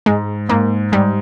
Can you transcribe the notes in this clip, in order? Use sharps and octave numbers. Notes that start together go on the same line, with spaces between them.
G#2 G#3
G#2 A#3
G#2 G3